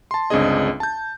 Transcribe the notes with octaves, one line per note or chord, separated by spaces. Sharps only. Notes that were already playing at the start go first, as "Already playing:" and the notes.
A5 C6
G1 C#2 C4 D4 G#4 D#5
A5 G6